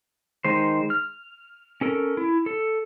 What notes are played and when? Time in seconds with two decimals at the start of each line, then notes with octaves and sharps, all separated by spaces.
0.45 D#3 G#3 C5
0.90 F6
1.81 C#4 A4 A#4
2.17 E4
2.46 A4